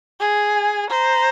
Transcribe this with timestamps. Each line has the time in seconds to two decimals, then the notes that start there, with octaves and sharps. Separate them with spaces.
0.20 G#4
0.54 G#5
0.90 C5 A#5